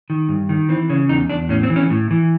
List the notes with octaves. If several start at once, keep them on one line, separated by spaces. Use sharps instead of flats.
D#3
G2
D#3
E3 C4
C#3 C#4
E2 D#4
E2 D4
A2 C#4
C4
E3
C#4
A2
E3